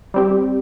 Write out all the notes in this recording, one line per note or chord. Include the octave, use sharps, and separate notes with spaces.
G3 C4 G4